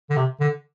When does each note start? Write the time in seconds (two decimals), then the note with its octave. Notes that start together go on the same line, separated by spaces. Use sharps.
0.10 D3
0.16 C3
0.40 D3